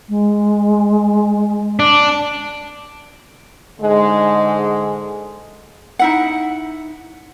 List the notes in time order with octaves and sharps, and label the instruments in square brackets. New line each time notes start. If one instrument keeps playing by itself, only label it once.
[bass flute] G#3
[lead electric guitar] D4
[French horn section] G#2 D3 G#3
[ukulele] D#4 E4 F#5